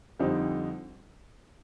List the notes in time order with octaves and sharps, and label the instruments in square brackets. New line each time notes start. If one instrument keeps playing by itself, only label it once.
[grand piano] F2 D3 G3 C4 D#4